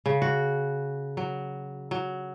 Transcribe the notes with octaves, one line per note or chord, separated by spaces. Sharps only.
C#3
F#4
F#3
F#3